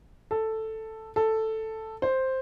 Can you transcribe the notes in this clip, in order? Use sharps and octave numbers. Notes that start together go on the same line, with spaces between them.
A4
A4
C5